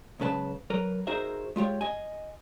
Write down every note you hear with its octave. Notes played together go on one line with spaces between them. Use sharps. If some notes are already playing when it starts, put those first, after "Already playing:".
C#2 F#2 C#3 B4 A5
F#3 A#4 B4
D#4 F#4 G#4 A#4 C5 E5
G#3 F4 G4 C#5
D#5 G#5